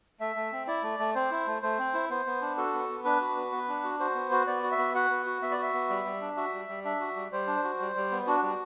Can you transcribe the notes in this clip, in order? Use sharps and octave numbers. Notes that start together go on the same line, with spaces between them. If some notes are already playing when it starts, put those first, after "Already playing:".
A3 E5
A3
C4
E4 D5
A3
A3
C4 C5
E4
A3
A3 C5
C4
E4
B3 C5
B3
D4
F#4 A4
B3
B3
D4 B4
F#4
B3
B3
D4
F#4
F#4 C5
B3
F#4
B3 D5
F#4
E5
B3
F#4 F#5
B3
F#4
B3 E5
D5
F#4 E5
B3
G3
G3
D4
F#4 E5
G3
G3
D4 E5
F#4
G3
G3 C5
D4
F#4
G3
G3
B3
D4 F#4
G3